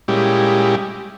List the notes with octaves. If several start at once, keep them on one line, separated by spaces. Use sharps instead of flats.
A#2 G3 G#3 C#4 E4 G4